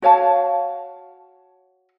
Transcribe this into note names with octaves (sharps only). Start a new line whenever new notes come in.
F#4 C#5 F5 A5